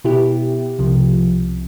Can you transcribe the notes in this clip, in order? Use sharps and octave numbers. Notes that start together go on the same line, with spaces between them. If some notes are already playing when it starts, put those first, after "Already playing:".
B2 B3 E4 G4
C2 C3 F3